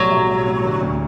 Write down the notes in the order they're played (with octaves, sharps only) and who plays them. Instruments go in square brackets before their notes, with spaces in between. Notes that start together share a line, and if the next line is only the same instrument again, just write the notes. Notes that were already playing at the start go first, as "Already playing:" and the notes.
Already playing: [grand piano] B1 A2 G3 [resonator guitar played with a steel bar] F#3
[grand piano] B1
G3
A2
D3
D2